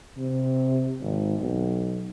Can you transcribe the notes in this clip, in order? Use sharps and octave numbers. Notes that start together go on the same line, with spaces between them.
C3
G#1
B1